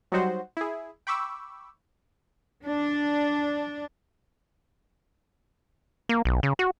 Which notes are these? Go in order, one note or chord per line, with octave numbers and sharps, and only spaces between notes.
F#3 G3 D#4 F#4 C5 F#5
E4 G#4
G5 B5 C#6 D6 E6
D4
A#3
B1
C#3
F#4